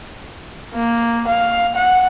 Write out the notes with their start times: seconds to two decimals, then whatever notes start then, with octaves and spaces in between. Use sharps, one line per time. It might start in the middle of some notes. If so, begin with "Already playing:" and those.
0.74 A#3
1.28 F5
1.76 F#5